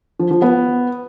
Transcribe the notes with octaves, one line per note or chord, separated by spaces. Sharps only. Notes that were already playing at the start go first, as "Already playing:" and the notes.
F3
F3
B3